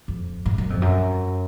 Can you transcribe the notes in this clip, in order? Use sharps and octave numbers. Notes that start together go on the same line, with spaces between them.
F2
G2
F#2
F2
F#2